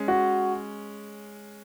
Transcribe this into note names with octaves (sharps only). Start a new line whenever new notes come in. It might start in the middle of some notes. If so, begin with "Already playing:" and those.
Already playing: G#3 C#4
F#4